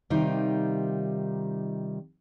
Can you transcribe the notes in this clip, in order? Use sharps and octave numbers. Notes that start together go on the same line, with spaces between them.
C3 D#3 G3 D#4 F4